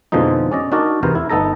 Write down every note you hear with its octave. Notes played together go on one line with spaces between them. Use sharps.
F2 B2 D3 F3 G#3 D#4
C#4 D5 D#5
D4 D#4 F#4 A#4 D5
E2 C3 B3 A#4 C5
E4
G1 B3 D#4 A4 A#5